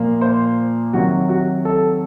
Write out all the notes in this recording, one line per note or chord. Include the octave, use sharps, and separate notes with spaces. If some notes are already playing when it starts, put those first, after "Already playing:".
Already playing: A#2 F3 A#3
C5
C3 D#3 F#3 F#4
F#4
A4